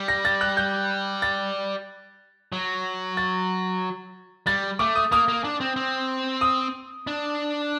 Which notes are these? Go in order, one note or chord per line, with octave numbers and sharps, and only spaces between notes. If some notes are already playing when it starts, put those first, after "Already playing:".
Already playing: G3
A#6
A6
F#6
G6
A6
F#3
A6
G3 A6
A3 D6
D#6
A#3 D#6
A#3
D4
C4
C4
D#6
D4